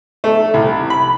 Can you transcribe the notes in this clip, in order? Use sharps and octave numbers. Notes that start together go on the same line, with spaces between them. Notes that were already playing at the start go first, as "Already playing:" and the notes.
A3
C2
B5